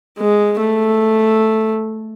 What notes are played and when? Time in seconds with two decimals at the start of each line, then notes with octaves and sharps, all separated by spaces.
0.18 G#3
0.60 A3